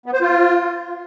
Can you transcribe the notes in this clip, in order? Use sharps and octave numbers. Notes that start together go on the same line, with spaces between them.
B3
C5
F4